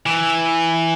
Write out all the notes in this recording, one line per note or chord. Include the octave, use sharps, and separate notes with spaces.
E3